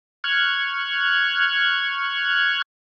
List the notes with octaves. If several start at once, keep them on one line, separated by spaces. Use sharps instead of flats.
C#6 F6 F#6 G#6